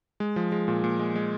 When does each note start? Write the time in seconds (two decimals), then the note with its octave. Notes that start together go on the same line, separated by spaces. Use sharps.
0.20 G#3
0.36 F3
0.52 G#3
0.68 A#2
0.84 A#2
0.99 G#3
1.16 G#3